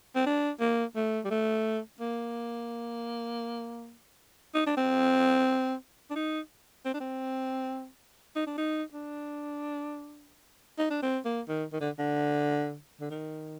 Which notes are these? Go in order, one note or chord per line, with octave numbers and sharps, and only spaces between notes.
C4
D4
A#3
A3
G3
A3
A#3
D#4
D4
C4
D4
D#4
C4
D4
C4
D#4
D4
D#4
D4
D#4
D4
C4
A#3
D#3
D#3
D3
D3
D3
D#3